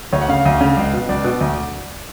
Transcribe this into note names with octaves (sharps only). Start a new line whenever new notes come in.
D2 C#5
F#5
C#3 F5
D2
C#3
C#2
B2
C#2 D5
B2
D2